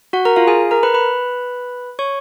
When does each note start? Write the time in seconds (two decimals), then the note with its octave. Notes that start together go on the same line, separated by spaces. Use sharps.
0.13 F#4 F#5
0.25 A#4 A#5
0.36 F4 F5
0.47 G#4 G#5
0.71 A#4 A#5
0.83 B4 B5
0.94 B4 B5
1.99 C#5 C#6